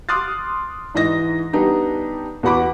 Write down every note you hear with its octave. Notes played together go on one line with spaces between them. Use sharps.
C6 D6 D#6 F6 F#6 A6
G#2 E3 D#5 A#6
G3 B3 D4 D#4 G4
E2 B3 F#4 F#5 B5 D6